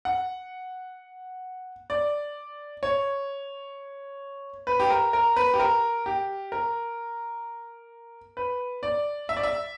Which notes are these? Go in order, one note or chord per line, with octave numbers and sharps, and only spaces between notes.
F#5
D5
C#5
B4
G4
A#4
A#4
B4
G4
A#4
G4
A#4
B4
D5
E5
D5
E5